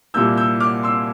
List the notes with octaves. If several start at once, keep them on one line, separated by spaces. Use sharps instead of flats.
C2 A#2 G3 A#3 E6 G6
E6 G6
D6 F6
C6 E6